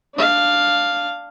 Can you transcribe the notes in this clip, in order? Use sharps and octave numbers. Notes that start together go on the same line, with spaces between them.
D4 F5